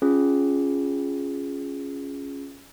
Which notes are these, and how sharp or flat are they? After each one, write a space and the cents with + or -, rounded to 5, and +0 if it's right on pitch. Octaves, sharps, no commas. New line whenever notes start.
C#4 +0 F4 +0 G#4 +0